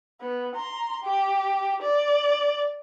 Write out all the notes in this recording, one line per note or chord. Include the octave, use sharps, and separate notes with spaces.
B3
A#5 C6
G4
D5